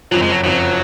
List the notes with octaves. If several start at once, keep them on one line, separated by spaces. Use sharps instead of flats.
F#1 F2 F3 F#3
G#3
F#3
F#1 F2 F3 F#3